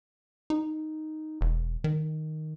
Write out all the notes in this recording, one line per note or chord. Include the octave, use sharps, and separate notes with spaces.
D#4
E1
D#3